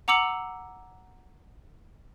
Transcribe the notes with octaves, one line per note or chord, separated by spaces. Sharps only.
F#5 A#5 D6 E6 C#7 F#7